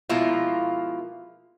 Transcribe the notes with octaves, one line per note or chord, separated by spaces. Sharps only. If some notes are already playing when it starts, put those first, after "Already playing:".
B2 F3 G#3 A#3 E4 F4